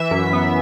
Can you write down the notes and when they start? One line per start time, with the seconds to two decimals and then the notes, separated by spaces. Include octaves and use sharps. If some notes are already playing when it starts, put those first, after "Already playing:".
Already playing: E3 E5
0.11 F#2
0.33 B3